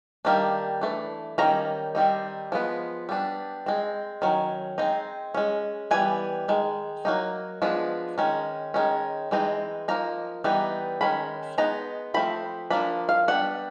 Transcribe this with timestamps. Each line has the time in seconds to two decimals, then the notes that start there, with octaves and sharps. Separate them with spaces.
0.25 D#3 G3 A#3 D4
0.81 E3 A3 D4
1.38 D#3 G3 A#3 C#4 A#5
1.95 D#3 G3 C4 D#4
2.52 F3 G#3 B3
3.09 G3 B3 D4
3.66 G#3 C4
4.22 D#3 F#3 C#4
4.78 G#3 C4 D#4
5.35 G#3 C#4
5.91 E3 G3 B3 G#5
6.48 D#3 G#3
7.05 F#3 A#3 D#4
7.62 F3 G#3 B3 D4
8.18 D#3 G#3 C#4
8.74 D#3 G#3 C#4
9.31 E3 G#3 C4 D#4
9.88 F3 A#3 D#4 A#5
10.44 E3 G3 B3 D#4
11.01 D#3 G#3 C#4 B5
11.58 G#3 B3 D#4 A#5
12.14 F3 A3 C4 B5
12.71 F3 A#3 D4 B5
13.09 F5
13.28 G3 B3 D4 F#5